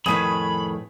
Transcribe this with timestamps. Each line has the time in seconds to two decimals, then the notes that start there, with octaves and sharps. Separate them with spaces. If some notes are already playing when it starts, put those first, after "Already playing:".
0.06 F2 A2 D#3 G#4 B4 C#5 B5